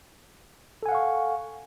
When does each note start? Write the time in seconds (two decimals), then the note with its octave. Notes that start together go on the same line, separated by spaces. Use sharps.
0.83 A4
0.86 G#5
0.89 F#5
0.92 F5
0.95 C#6